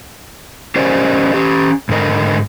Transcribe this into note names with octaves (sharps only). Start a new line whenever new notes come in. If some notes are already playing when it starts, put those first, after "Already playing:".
C#4 G4 A#4 C5 D5 D#5
C#4 G4
G#2 D3 A#4 D#5